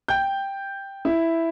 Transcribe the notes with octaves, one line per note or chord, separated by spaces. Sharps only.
G5 G6
E4